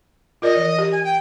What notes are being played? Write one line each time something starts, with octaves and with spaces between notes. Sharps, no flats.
F4 A#4 D5 D#5
E3 D5
G4
G#5
G5